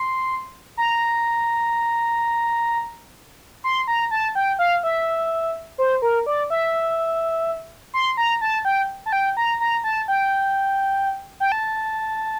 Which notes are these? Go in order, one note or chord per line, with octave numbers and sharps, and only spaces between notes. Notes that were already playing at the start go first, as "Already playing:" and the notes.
Already playing: C6
A#5
C6
A#5
A5
G5
F5
E5
C5
A#4
D5
E5
C6
A#5
A5
G5
A5
G5
A#5
A#5
A5
G5
G5
A5